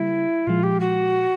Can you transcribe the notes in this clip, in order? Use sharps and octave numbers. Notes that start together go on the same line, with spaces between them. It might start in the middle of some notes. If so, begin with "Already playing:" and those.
Already playing: C#3 G3 A#3 E4
A#2 F3 G#3 F4
G4
F#4